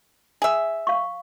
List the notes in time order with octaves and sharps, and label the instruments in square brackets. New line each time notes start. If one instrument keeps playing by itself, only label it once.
[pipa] G#4 E5
[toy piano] F5 C#6